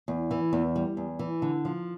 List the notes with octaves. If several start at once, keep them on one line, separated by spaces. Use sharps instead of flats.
E2
E3
E2
G3
E2
E3
D3
F3